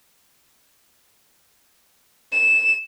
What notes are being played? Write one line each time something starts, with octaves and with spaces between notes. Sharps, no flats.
E7